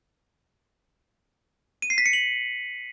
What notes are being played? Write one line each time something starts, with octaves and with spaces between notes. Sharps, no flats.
D#7
C7
B6
C#7
F#7